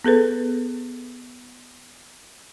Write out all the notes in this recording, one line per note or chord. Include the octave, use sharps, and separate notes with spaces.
B3 G#4 A4 B4